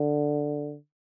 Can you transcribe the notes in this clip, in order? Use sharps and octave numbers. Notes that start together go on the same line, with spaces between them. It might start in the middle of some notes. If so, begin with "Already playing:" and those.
Already playing: D3